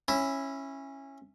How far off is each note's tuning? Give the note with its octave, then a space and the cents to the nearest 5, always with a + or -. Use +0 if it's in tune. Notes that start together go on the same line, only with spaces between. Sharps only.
C#4 -20 E4 +0